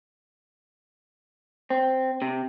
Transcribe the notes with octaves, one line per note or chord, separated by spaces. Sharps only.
C4
C3